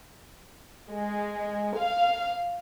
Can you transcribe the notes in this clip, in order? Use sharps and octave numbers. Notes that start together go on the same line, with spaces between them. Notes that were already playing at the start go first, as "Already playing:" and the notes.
G#3
F5